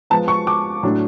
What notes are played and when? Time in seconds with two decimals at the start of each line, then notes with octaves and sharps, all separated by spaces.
0.10 F3 G#3 B3 A5
0.28 C#6
0.47 D6
0.83 A2 F#3 A3 D4